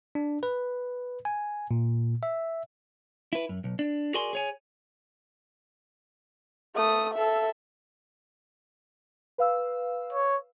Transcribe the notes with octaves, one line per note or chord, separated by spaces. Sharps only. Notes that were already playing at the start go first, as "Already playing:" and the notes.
D4
B4
G#5
A#2
E5
E4 B4
F#2
B1
D4
F#4 G#4 A#4 D5 G#5 C6
G#4 C#5 G#5
A3 D#6
A4 E5
B4 F5 E6
C#5